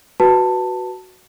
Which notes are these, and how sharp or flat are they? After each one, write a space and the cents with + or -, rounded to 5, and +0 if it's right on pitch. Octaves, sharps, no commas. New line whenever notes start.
F#4 +0 B4 -5 A5 +15